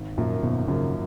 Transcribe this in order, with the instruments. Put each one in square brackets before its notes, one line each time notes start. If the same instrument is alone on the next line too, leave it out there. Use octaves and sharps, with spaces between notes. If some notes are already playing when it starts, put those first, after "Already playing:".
Already playing: [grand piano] G#1
[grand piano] F#2 F3 A#3 [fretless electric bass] A#2
[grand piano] G#1 [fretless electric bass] B2
[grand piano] F#2 F3 A#3 [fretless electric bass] C#3